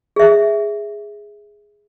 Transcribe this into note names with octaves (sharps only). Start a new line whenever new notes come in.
G#4 E5